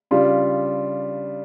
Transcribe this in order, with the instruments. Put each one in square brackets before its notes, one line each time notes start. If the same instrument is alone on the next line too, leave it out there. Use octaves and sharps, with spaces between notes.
[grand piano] C#3 G3 D4 F4